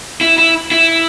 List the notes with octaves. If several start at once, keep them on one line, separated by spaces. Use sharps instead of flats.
E4
E4
E4